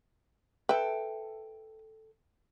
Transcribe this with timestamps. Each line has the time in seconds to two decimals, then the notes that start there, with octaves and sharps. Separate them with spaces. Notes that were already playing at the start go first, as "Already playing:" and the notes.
0.69 A4 B4 E5 G5